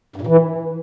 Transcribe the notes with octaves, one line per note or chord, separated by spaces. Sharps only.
G2
A#2
E3